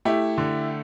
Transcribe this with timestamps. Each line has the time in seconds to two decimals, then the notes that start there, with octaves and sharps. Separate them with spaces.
0.05 A3 E4 G4
0.38 D3